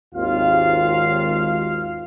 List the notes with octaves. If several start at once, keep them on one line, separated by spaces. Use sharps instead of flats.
G#1 D#2 F4 F5